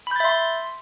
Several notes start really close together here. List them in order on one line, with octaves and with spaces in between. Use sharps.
B5 G6 A6 E5 C6